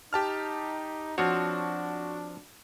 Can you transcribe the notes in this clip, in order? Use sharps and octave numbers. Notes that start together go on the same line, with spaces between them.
D#4 G4 A5 F6
F3 C4 D4 F#4 C#5